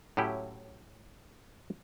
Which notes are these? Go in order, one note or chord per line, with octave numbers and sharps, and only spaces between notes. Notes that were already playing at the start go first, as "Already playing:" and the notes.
A2 F#3 C#4 E4 G4